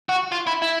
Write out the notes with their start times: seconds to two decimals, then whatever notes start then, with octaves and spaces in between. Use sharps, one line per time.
0.09 F#4
0.32 F4
0.47 E4
0.62 E4